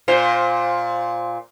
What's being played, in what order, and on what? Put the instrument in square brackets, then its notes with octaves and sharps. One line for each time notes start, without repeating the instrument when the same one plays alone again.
[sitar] A#2 C5